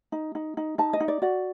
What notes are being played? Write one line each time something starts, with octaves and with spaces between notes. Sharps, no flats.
D#4
D#4
D#4
D#4 A5
D#5
D#4
D5
F#4 D5